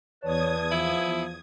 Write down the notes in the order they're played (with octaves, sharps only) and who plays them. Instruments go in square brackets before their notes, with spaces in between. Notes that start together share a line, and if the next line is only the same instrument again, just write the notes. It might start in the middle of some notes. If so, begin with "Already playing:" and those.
[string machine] E2 D#6 G#6 [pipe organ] B4 D5 A5 [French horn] C#5
[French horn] F3 [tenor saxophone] E4 [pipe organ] F5